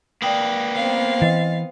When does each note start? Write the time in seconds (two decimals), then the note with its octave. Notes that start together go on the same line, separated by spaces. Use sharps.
0.22 A#3 B4 D5 G5 D#6
0.74 B3 C4 F5
1.22 E3 D#5 A6